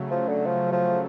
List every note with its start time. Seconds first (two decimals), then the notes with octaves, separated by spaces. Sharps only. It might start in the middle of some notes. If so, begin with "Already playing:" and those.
Already playing: C#3 F#3 A3
0.11 F3
0.29 D3
0.46 F3
0.72 F3